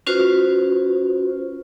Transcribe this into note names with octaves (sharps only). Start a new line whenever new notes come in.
C#4 F4 F#4 B4 C5